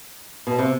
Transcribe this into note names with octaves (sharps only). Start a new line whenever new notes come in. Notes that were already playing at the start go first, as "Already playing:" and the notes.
B2
C3